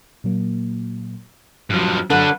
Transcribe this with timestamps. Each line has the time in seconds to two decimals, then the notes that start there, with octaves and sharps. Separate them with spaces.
0.24 A#2 F#3 A#3
1.70 G2 F3 F#3 F#4
2.10 D3 F#3 D4 B4 A5